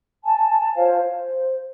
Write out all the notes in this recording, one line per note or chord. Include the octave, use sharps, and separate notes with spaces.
G#5 A5
F4 C5 C#5 F5
C5